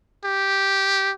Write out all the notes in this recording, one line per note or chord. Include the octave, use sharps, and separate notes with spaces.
G4